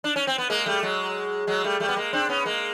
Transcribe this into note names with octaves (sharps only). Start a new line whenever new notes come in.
D4
C#4
C4
B3
G#3 A#3
G3 A3
F#3 G#3
F#3 G#3
G3 A3
G3 A3
B3
G#3 A#3
C4 D4
B3 C#4
G#3 A#3